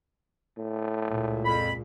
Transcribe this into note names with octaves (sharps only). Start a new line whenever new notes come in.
A2
C#2 A#2
F2 B5